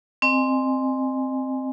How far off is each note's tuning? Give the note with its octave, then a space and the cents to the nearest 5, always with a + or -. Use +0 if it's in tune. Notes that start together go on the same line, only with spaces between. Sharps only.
C4 +0 D#5 -30 G#5 +0